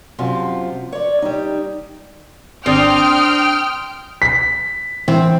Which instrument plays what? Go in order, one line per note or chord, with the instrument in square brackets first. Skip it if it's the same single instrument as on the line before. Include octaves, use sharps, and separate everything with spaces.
[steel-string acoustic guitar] F#2 C3 F3 F4
C#5 D5
G3 D#4
[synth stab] G#1 D5 [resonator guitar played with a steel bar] C4 [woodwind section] D4 C6 D#6 [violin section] G5 F6
[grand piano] B6
[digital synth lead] E3 [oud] C4